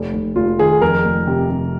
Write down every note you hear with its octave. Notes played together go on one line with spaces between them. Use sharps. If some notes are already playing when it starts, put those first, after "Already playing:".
Already playing: F1
F1
F1 F4
D#3 G#4
F2 A#4
F1
C3
C3